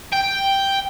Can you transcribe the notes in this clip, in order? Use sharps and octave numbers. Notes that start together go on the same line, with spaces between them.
G5